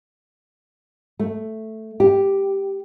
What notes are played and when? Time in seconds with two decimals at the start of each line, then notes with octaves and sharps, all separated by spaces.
1.19 A3
2.00 G4